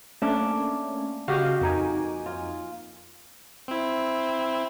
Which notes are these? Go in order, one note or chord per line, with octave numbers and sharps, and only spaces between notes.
A3 A#3 C#4 D4
C#3 F#4 G4 D#5 F5 F6
F2 A#3 D#4 G#5
F4
C4 E4